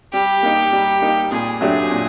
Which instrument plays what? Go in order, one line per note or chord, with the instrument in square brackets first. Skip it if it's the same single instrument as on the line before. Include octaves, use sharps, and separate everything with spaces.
[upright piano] G3 [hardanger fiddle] G4
[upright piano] A#3 D#4
G3
A#3 D#4
[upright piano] A#2 [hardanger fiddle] G#4
[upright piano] F#3 A3 D4 G4
A#2